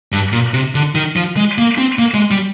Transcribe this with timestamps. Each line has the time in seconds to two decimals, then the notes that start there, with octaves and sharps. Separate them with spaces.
0.12 G2
0.32 A#2
0.54 C3
0.75 D3
0.95 D#3
1.16 F3
1.36 G#3
1.58 A#3
1.78 C4
1.99 A#3
2.14 G#3
2.31 G3